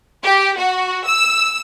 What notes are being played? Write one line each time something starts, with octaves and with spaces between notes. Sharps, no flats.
G4
F#4
E6